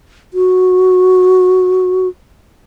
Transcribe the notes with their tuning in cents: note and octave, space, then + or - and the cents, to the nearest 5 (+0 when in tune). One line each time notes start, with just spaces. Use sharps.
F#4 -5